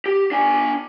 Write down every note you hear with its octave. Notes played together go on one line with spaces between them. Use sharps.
G4
D4 G#5